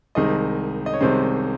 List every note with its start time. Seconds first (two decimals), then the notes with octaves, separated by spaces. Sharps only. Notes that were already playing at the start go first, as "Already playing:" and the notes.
0.15 C2 C3 D#3 G#3 D#5
0.86 D#5
0.93 C#5
1.00 C2 C3 D#3 G#3 C5